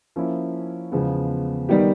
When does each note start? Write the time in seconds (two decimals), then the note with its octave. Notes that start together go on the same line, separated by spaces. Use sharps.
0.16 F3 A#3 C#4 E4
0.92 E2 C#3 F3 G#3 B3
1.69 D#3 G3 B3 D#4 G4